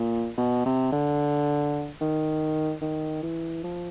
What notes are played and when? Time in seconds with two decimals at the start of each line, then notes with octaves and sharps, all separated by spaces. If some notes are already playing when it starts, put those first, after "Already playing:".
Already playing: A#2
0.37 B2
0.66 C3
0.92 D3
2.01 D#3
2.82 D#3
3.23 E3
3.64 F3